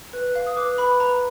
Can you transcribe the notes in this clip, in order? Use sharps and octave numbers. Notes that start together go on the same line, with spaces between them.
B4
F5
D#6
B4 D6
B4 B5
B4 A#5